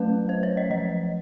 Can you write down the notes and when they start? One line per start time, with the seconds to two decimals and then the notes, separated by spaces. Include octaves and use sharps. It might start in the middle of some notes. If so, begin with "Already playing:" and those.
Already playing: F#3 A3 C#4 B4
0.29 C5
0.43 C#5
0.57 D#5
0.70 F3 D#5